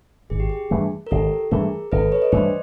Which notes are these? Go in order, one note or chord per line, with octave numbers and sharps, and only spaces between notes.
G#1 G#4
G4
G#4
G2 E3 A3
A#4
G#1 G4 A4
G2 E3 A3 G#4 A#4
G#1 A4 B4
B4 C#5
D#5
G2 E3 A3 C5 D5